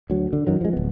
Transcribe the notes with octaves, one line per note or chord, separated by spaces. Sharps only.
D2 F#3
D3
F#2 D#3 F#3
F3 G#3
D1 B3